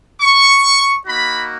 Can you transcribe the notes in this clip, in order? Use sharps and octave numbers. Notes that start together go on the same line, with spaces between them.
C#6
A#3 D#4 F#4 B5